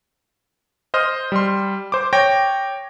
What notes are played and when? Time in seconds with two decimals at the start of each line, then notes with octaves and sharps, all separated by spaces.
0.94 C5 D#5 F6
1.32 G3 C6
1.92 C5 D6
2.13 C#5 G5 A#6